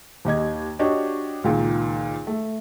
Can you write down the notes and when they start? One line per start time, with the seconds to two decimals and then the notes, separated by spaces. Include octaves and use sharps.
0.25 D#2 G4 D#5 G#6
0.79 D4 F#4 G4 C#5 D#5
1.44 C#2 A#2 D#3
2.27 A3